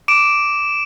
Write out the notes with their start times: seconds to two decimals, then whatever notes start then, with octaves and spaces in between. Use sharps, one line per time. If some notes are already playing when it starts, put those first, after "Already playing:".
0.08 D6 D7 E7